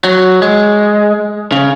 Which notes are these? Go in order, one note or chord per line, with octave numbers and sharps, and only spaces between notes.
F#3
G#3
C#3